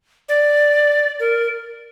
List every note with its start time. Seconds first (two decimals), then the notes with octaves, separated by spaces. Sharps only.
0.29 D5
1.20 A#4